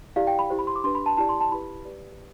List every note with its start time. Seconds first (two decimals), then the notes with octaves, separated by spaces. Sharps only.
0.16 E4 G4 D5 F5
0.27 G5
0.39 B5
0.50 E4 G4 C5
0.59 B5
0.67 C6
0.76 D6
0.84 D4 G4 B4 C6
0.95 B5
1.06 A5
1.17 E4 G4 D5 A5
1.29 C6
1.40 A5
1.51 E4 G4 B4 B5
1.85 G4 B4 D5